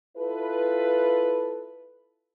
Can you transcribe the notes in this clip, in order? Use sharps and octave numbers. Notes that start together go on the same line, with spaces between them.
E4 F4 A4 B4